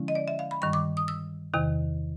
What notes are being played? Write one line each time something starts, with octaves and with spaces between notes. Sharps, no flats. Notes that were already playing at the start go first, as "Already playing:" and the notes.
Already playing: D3 F3 G#3 C#4 E4
D#5
D5
E5
F5
B5
G2 D#3 G3 C#6
D6
D#6
E6
E2 C3 D#3